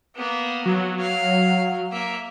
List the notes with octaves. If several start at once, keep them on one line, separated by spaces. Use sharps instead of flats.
A#3 B3
F#3 B3
F5
A#3 E5